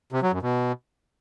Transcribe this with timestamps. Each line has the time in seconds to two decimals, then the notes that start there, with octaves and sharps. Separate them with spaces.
0.12 C3
0.22 F#3
0.32 F#2
0.42 B2